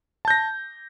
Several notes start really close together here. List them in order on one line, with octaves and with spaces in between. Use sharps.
A5 G6 A#6